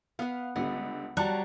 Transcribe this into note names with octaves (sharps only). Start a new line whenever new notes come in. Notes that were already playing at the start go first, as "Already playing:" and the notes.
B3 B4 F5
C#2 D3 G3 B3
F#3 G3 A5 A#5 C#6 F#6